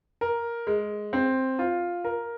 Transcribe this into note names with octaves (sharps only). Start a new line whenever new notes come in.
A#4
G#3
C4
F4
A#4